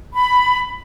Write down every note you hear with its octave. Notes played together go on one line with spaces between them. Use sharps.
B5